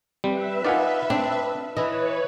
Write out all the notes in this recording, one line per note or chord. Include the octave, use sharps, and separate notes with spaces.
G3 C4 B4 E5
D#4 F4 A#4 D5 F#5 G#5
C4 D4
E3 E4 B4 C#5 D#5